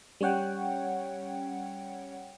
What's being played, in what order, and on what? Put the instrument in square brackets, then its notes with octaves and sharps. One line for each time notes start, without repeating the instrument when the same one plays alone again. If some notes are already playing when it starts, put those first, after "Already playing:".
[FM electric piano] G3 C#4 C#5 F#5 G5